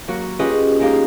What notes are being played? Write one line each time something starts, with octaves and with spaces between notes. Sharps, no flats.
F#3 A#3 F#4
C#4 F4 G4 G#4 B4 D#5
G#3 A#3 D#4 G4 F5